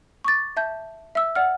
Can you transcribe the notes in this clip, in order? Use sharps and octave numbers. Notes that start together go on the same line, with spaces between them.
C#6 D6 A6
E5 A5 G6
E5 E6
D5 F#5 F6